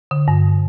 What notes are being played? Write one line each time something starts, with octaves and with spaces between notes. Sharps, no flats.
D3
G2